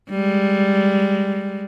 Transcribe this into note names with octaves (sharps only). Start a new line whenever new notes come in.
G3 G#3